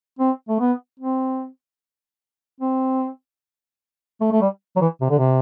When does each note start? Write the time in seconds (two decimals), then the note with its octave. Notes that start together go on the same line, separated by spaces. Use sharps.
0.19 C4
0.49 A3
0.60 B3
1.00 C4
2.60 C4
4.21 A3
4.32 A3
4.42 G3
4.76 F#3
4.81 E3
5.01 C3
5.10 D3
5.18 C3